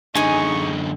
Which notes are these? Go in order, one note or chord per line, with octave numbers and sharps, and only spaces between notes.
F#2 D3 D#4 G#4 G#5 C#6